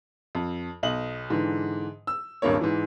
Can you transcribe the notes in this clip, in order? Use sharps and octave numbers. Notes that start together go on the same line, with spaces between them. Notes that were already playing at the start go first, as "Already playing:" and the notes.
F2
B1 D#5 F#7
G#2 D3 E3
E6
D#1 G#1 G2 A#3 C#5
G#2 E3